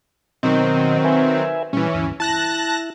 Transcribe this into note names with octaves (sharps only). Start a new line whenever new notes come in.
B2 D#3 F#3 C4 D#5
B4 E5 G#5
A#2 E3 G3 C#4
D2 G2
E4 A5 F#6 A#6